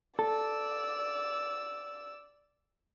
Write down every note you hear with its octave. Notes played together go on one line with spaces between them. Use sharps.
A4 D5 E6